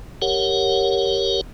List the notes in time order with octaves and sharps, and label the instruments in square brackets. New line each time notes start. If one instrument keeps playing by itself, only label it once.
[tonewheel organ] G4 A#4 C#5 F#5